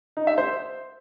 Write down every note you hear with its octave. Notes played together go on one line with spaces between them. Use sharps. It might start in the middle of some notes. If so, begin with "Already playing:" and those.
D#4
E5
C5